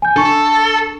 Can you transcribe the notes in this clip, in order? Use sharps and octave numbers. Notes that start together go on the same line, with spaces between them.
G#5 G6
D4 A4 C#6